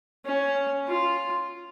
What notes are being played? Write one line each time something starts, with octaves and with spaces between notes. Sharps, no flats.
C#4
F4